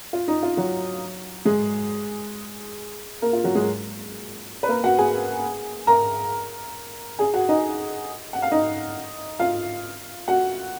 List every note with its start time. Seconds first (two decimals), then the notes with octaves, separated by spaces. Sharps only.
0.13 F4
0.28 D#4
0.43 F4
0.57 F#3 F#4
1.45 G#3 G#4
3.22 A#3 A#4
3.33 F4
3.44 F#3 F#4
3.55 G#3 G#4
4.63 B4
4.69 A#3 A#4
4.84 F#4 F#5
4.98 G#4 G#5
5.87 A#4 A#5
7.19 G#4 G#5
7.34 F#4 F#5
7.49 D#4 D#5
8.33 F#5
8.42 F5
8.52 D#4 D#5
9.39 F4 F5
10.28 F#4 F#5